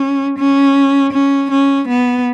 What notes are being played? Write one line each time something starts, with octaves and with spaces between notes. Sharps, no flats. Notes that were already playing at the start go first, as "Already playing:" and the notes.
Already playing: C#4
C#4
C#4
C#4
B3